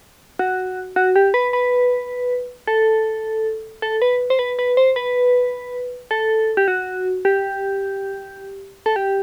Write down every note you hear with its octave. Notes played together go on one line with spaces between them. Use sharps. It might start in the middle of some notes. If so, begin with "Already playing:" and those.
F#4
F#4
G4
B4
B4
A4
A4
B4
C5
B4
B4
C5
B4
A4
G4
F#4
G4
A4
G4